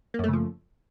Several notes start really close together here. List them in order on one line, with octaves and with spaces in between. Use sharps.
A#3 F#2 A3 C#3 F3